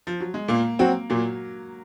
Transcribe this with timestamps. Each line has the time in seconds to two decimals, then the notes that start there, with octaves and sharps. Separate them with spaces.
0.07 F3
0.20 F#3
0.34 G#3
0.48 A#2 A#3
0.79 F#3 C4 F#4
1.10 A#2 F#3